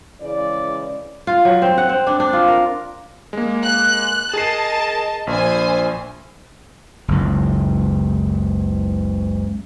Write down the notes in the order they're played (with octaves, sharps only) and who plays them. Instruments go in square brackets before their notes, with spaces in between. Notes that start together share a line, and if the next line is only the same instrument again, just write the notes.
[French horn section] C#3 E3 G#3 D5
[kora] F4
F#3
C4
F#5
C4
D4
D4
F4
A#4
[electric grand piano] G#3 A#3
[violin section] F#6
[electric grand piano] G#4 C7 [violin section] A#4 D#5 A5
[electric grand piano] A#1 [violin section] C5 G#5
[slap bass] F#1 C#2